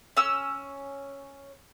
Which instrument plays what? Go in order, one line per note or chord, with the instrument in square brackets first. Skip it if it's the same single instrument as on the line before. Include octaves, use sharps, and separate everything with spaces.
[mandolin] C#4 E6